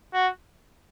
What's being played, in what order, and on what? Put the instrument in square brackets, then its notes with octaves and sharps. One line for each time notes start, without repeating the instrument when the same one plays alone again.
[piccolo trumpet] F#4